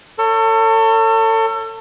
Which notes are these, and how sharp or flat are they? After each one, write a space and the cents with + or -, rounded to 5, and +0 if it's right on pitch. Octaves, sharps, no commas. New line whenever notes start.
A4 +35 C#5 +0